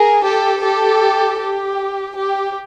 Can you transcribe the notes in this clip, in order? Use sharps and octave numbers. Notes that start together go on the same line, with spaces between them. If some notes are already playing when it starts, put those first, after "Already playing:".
Already playing: G#4 A#4
G4 A4
G4 A4
G4
G4